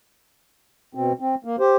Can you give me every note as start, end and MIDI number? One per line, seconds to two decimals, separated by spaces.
0.95 1.12 47
0.95 1.12 60
1.20 1.35 60
1.45 1.56 58
1.60 1.77 67
1.60 1.77 72